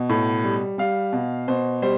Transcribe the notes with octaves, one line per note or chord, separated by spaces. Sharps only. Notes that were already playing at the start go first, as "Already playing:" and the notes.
Already playing: B2
A2
G3
G3 F5
B2
B2 C5
G3 C5